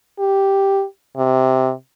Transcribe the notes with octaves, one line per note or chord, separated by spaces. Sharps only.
G4
C3